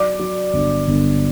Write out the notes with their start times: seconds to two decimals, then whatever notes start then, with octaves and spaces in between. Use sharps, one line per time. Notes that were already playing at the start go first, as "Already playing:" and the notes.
Already playing: F#3 D5 D6
0.19 F#3
0.54 G1
0.88 G1